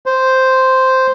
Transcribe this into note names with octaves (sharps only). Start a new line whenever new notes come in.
C5